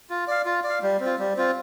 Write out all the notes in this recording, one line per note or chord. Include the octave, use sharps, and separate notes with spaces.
F4
D5 F5
F4
D5
F5
G3
C4
F4
G3
C4 F4